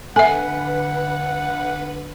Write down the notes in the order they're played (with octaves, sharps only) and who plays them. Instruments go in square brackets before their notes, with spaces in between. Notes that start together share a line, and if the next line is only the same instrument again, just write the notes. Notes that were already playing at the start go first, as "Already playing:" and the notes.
[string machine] D3 B4 [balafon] A4 E5 [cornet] F#5 [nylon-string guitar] G#5